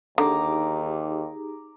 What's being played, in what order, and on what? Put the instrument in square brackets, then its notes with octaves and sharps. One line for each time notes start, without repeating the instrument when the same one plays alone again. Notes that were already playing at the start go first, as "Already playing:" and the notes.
[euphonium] D#2 [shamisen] D3 [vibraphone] D#4 G4 G#4 [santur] A#5 D6